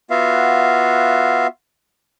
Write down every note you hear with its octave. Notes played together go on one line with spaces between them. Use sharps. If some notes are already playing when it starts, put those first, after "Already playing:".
B3 F4 F#4 E5 F5